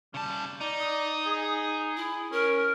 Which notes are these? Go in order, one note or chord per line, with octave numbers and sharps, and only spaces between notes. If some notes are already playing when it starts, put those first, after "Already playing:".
C#3 G3 A5
D#4 D5
D#6
G#4
E4
C#4 A#4